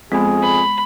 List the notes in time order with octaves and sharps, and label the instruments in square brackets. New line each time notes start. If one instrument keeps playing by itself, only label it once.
[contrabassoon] F2 [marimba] G#3 B3 [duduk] G#4
[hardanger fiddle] B5